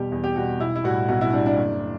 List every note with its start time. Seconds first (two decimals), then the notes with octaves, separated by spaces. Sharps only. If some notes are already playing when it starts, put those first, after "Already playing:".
Already playing: E2 B2 G3 G4
0.12 E2
0.24 G4
0.36 B2 G3 F#4
0.60 B1 E4
0.76 E4
0.84 A2 G3 F#4
1.08 B1 F#4
1.21 E4
1.33 A2 G3 D4
1.46 D4
1.57 F#1